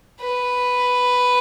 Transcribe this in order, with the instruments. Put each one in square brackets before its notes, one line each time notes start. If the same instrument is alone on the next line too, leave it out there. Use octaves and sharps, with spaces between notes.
[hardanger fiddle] B4